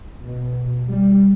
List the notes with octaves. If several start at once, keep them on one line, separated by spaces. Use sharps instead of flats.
B2
G3